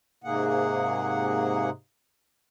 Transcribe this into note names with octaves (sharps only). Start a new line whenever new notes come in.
G#2 C3 A#3 G#4 F#5